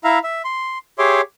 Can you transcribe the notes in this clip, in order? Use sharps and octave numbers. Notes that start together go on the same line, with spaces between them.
E4 E5 F5 A#5
E5
C6
G4 G#4 C#5 E5 C6 D6